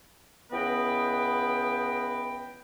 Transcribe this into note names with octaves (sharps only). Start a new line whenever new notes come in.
C#2 E3 B3 B4 D#5 G5